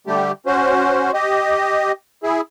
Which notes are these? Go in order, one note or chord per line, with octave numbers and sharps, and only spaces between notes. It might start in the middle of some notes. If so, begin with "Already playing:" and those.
D3 G3 A3 G4
C#4 F#4 C5
G4 D#5
E4 G#4